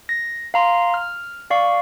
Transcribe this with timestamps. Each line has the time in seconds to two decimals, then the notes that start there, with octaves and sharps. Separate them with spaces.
0.09 A#6
0.54 F5 A#5 C6
0.94 F6
1.50 D5 F5 C#6